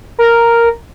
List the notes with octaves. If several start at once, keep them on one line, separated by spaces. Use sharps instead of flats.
A#4